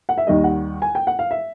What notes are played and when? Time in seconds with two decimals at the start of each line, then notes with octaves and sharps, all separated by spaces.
0.09 F#5
0.18 E5
0.27 D#2 D#3 G3 D#5
0.44 F#5
0.82 G#5
0.95 G5
1.07 F#5
1.19 F5
1.31 E5